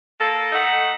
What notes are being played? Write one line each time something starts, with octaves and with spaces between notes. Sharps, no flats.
A#3 A4
A3 D#4 F#5